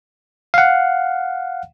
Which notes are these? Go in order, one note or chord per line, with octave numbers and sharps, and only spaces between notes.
F5 F#5